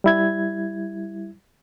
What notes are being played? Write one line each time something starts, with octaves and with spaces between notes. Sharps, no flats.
G3 E4 G#6